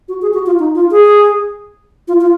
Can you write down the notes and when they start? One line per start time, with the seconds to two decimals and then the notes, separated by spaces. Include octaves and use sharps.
0.08 F#4
0.22 G#4
0.33 F#4
0.46 F4
0.59 D#4
0.75 F4
0.91 G#4
2.08 F4
2.21 F4